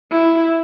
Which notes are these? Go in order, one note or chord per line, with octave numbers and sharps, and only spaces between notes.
E4